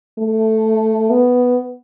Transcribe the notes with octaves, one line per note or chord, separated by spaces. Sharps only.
A3
B3